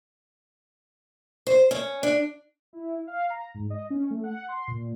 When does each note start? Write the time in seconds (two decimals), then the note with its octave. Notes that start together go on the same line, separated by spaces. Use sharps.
1.47 C5
1.71 C#4
2.03 D4
2.73 E4
3.07 F5
3.30 A#5
3.54 G#2
3.70 D#5
3.90 C#4
4.10 A3
4.23 F#5
4.48 C6
4.68 A#2